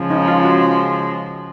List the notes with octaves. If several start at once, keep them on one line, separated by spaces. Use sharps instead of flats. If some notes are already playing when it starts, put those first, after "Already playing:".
Already playing: C#3 F3 G#3
D#4
F4
F#4